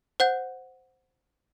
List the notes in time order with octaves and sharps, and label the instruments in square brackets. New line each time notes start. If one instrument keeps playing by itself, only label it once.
[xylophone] C5 F#5 G6